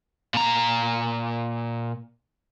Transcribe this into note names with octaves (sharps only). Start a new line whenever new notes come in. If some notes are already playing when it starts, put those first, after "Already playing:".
A#2 A#5